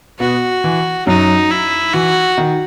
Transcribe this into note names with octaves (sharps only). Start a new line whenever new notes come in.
B2 B3 F#4
E3
F#2 F#3 D#4
E4
E3 F#4
D#3